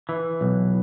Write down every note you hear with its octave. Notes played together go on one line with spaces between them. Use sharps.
E3
B1